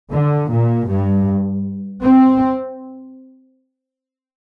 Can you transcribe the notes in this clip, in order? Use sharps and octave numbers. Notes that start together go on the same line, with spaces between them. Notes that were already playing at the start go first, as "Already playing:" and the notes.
D3
A#2
G2
C4